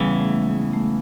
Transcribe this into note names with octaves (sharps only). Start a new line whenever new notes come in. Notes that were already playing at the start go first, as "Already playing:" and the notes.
Already playing: E2 C#3 E3 G3
A3
G#3
A3